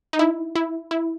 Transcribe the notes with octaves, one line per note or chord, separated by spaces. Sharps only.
D#4
E4
E4
E4